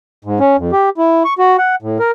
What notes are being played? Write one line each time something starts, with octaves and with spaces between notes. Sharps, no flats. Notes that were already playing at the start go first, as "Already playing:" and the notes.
G#2
C#4
F2
G4
E4
C#6
F#4
F#5
A2
A#4